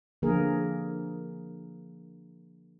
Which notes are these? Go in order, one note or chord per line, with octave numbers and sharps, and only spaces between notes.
D3 F3 A#3 G#4 A#4